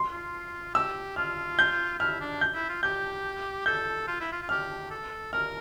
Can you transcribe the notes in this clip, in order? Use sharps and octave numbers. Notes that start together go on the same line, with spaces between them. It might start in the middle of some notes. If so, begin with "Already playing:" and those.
Already playing: C6
F4
G4 E6
F4 F6
G6
E4 F6
D4
G6
E4
F4
G4 G6
A4 G6
F4
E4
F4
F4
G4 F6
A4
A#4 F6